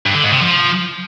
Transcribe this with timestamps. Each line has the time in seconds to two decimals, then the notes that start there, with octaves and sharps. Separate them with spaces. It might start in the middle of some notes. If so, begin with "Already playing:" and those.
0.06 G2
0.14 D3
0.23 G#2
0.32 C3
0.41 F3